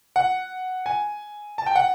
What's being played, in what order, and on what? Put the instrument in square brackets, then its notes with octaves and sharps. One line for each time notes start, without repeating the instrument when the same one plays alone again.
[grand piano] F#5
G#5
A5
G5
F#5